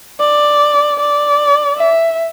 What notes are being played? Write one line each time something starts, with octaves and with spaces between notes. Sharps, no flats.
D5
D5
E5